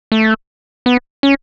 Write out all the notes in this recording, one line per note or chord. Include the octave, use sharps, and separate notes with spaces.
A3
B3
C#4